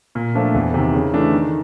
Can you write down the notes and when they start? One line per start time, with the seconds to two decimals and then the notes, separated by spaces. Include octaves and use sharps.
0.15 A#2
0.35 F3 A3 D4 F4
0.55 E2
0.74 C3 D#3
0.94 C#3
1.13 E3 A3 D4
1.33 D#3